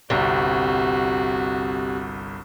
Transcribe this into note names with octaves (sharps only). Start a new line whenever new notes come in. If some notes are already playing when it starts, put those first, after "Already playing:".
G1 C2 C3 F#4